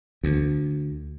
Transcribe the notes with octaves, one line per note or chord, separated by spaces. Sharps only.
D2